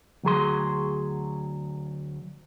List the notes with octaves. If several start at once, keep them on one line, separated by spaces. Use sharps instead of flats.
D2 F#3 G#4 C6